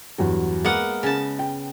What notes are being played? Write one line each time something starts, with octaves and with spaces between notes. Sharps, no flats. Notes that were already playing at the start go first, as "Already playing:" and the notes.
E2 G2 F#3
G#3 A#3 B3 F#5
C#3 A5
G5